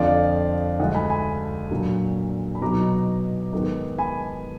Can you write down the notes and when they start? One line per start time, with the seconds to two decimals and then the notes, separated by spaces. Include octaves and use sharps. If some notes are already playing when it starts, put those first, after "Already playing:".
Already playing: F2 D3 F3 D5 F5
0.79 D2 D3 G#3 D#5 F#5
0.95 G#5 B5
1.10 G#5 B5
1.71 A#2 F#3 D4
2.55 B5
2.62 B2 F#3 B3 D#4 A#5 D6
3.53 G#2 D#3 G#3 B3 D#4
3.98 G#5 B5